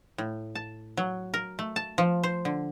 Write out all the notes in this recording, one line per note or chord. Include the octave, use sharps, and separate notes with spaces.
A2
A5
F#3
A#4
A3
A5
F3
C5
D3